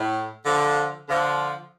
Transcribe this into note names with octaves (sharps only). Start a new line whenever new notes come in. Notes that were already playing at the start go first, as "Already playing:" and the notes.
Already playing: A2
D3 F3
D3 F3